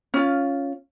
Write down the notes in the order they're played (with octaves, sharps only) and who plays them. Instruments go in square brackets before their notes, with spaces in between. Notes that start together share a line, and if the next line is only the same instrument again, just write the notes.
[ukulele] C#4 F4